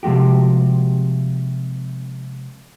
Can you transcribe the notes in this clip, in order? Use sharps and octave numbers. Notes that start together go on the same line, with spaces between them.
C3 F3 G#3 F#4 G4